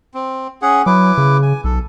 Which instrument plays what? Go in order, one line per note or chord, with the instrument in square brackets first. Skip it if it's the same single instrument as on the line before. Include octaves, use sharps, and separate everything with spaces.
[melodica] C4
C#4 G#4 F#5
[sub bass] F#3 [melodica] E4 B4 D6
[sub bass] C#3
[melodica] G#5
[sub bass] B1 [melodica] A4